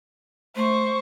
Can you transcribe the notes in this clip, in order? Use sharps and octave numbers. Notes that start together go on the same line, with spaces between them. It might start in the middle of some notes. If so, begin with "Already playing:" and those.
A3 C5 C#6